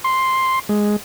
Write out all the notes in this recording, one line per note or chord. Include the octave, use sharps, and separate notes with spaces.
C6
G#3